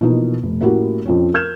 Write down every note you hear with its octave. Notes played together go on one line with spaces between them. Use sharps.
B2 E3 F3 A#3 D#4 F#4
F1
A2 A#3 C#4 E4 F#4 G4
F2 F3 C4 C#4
A#4 F6 G6 G#6 E7